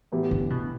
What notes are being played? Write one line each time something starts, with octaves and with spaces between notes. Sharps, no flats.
A2 E3 B3 E4 G4
D3
B2